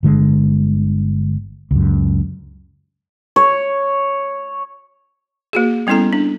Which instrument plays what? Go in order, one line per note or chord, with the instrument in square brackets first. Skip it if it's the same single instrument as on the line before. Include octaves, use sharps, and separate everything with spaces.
[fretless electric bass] G1 D3 G#3
C#2 F#2
[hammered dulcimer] C#5
[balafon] A#3 F#4 G#4
G3 B3 C#4 E4 A4 A#5
D4